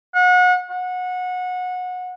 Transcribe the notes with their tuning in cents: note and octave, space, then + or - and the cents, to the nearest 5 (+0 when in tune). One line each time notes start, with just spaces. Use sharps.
F#5 -30
F#5 -25